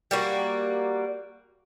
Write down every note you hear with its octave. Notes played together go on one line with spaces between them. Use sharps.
G3 A#3 F#4